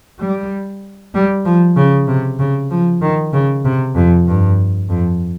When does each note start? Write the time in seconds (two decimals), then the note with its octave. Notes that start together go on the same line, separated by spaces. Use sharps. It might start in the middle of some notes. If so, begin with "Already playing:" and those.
0.20 G3
1.14 G3
1.45 F3
1.77 C#3
2.08 C3
2.39 C#3
2.71 F3
3.02 D#3
3.33 C#3
3.65 C3
3.96 F2
4.27 G2
4.90 F2